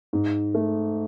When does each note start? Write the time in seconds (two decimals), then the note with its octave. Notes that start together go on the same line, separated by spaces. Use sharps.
0.13 G#2
0.55 A3